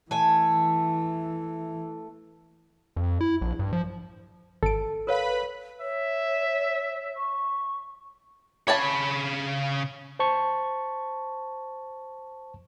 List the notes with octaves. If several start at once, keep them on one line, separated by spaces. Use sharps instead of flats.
E3 A3 G#5
F2
E4
A#1
G2
F3
G#1 A4 D7
A#4 B4 C#5 F5 B5
C#5 E5
C#6
C#3 C#5 G#5 A5 B5
C5 A5 C#6